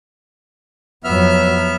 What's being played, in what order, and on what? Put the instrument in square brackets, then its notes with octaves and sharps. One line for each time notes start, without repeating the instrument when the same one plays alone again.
[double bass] F2 F#3 [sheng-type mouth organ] B3 E5 F6